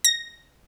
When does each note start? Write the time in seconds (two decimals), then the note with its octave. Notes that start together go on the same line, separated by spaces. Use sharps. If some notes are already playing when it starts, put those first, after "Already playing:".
0.04 A#6